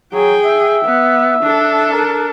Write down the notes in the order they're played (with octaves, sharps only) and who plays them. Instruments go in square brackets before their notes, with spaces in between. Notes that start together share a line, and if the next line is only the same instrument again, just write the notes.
[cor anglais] F#3 [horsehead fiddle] G#4 G5
[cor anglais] E5
[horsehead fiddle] B3
D4 A4
[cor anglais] A#4